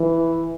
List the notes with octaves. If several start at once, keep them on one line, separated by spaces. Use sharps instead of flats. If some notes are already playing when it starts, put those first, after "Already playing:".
Already playing: E3